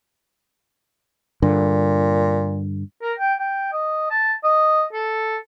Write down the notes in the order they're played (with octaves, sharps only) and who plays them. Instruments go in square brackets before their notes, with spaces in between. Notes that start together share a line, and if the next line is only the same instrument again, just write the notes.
[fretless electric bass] G2 D3 [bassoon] A#2
[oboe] A#4
G5
G5
D#5
A5
D#5
A4